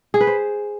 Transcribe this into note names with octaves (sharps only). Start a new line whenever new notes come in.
G#4
B4
C5